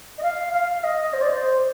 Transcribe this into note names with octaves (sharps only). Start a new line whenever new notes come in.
D#5
F5
F5
D#5
C5
D5
C5